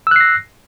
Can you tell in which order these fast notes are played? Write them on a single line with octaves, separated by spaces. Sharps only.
E6 F#6 C7 A#6